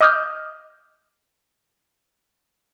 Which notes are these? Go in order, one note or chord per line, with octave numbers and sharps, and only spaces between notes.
D#5 D6 D#6 F6 G6